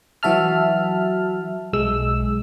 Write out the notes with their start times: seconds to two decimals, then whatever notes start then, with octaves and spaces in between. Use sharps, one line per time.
0.23 E3 F#3 F#4 E5 A5 F6
1.73 B1 G#3 E6